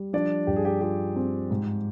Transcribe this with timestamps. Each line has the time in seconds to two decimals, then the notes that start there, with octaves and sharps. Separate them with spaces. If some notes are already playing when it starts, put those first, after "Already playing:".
Already playing: G3
0.13 F3 D4 D5
0.47 G2 G4
0.56 G#4
0.65 G4
0.81 F4 G4
1.16 C4
1.51 G#2